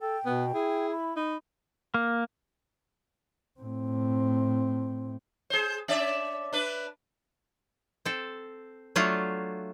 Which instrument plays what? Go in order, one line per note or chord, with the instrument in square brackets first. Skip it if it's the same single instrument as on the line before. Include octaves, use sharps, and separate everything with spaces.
[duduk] A4 [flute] G5
[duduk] B2 [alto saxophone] B3
[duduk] E4 [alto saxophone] G#4
[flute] B5
[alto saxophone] D#4 [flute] B5
[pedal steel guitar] A#3
[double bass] A2 C4
[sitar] G#4 C5
C#4 D5 E5
D4 B4
[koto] C4 A4
F#3 A3 D4 F4